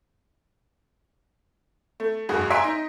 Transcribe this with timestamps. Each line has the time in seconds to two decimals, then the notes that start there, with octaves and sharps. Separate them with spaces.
2.00 A3
2.29 F1 G2 F#4 G#4
2.50 E5 G#5 A#5 C6 B6 D7
2.64 D#4